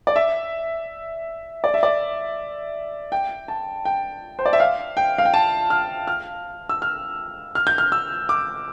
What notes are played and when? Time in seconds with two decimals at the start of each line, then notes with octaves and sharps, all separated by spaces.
0.07 D5
0.16 E5
1.64 D5
1.74 E5
1.83 D5
3.12 G5
3.48 A5
3.85 G5
4.39 C5
4.46 D5
4.53 E5
4.60 F5
4.97 G5
5.18 F5
5.25 G5
5.34 A5
5.70 F6
6.08 F6
6.69 E6
6.82 F6
7.55 F6
7.67 G6
7.78 F6
7.92 E6
8.29 D6